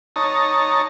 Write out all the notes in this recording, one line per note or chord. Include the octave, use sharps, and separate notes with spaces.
D#4 C#5 A5 A#5